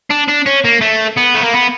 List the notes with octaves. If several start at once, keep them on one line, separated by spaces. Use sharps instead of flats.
D4
D4
C#4
A#3
A3
B3
A3
A#3
B3